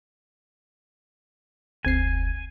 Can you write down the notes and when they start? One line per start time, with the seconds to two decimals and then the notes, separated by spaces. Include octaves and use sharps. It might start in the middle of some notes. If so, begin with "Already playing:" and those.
1.85 F1 D2 C4 G#5 C7